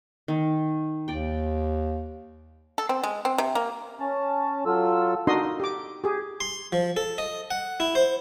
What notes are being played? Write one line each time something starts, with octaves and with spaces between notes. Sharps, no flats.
D#3
D#2 D5 G5
A4
C4
G#3
C4
C3
A#3
C#4 A5
F#3 F4 A4 E6
D4 D#4 F#4 A#4 D#5 C6
G4 D6
G4 G#4
C6
F3
A4
D#5
F#5
E4
C5